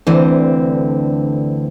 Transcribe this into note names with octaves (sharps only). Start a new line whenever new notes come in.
D2 D3 E3 C4